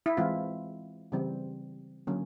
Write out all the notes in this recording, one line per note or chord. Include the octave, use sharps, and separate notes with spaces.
E4
E3 G#3 C4 F4
C#3 E3 G3 C4
D3 F#3 A#3 C#4